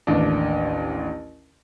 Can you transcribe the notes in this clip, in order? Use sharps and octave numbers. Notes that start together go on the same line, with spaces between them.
A1 D#2 D4